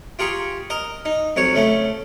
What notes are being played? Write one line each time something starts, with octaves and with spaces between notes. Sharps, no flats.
F4 G4 G#4 A#5 C#6
A#4 D#5
D#4
F2 F#3 C#5 C#6
C#3 A3 C#4